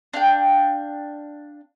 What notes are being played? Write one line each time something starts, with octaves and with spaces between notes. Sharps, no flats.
D4 F5 G5